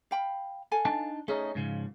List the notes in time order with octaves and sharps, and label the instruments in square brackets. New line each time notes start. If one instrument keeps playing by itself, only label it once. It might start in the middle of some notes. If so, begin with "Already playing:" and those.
[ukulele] F5 G5 B5
A4 F5 G#5
[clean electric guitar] D4 D#4 A5
[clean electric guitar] A3 C#4 D#4 [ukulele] G#4
[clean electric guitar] G#2 C#3 F3